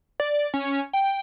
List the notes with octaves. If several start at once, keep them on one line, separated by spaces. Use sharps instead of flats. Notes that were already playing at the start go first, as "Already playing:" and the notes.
D5
C#4
G5